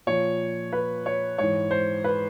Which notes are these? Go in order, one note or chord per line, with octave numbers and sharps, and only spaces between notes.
A#2 F3 C#5
B4
C#5
G#2 E3 C#5
C5
B4